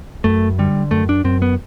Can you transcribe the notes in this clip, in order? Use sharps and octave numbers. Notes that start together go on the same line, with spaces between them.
F#2 A3
D3 G3
F#2 A3
D4
F#2 C4
B3